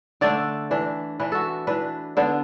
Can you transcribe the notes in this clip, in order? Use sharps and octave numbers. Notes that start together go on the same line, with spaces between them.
D3 A3 D4 D5
E3 D4
E3 D4 B4
F#4 A4
E3 D4 B4
D3 B3 D4